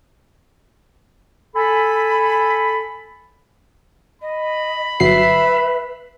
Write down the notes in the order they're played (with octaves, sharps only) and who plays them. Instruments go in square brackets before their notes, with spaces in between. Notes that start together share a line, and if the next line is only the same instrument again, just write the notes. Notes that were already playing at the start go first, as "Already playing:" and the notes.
[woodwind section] A4 G#5 B5
[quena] D#5 [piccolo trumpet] B5
[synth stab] G1 F#3 C7 [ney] B4 [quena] E5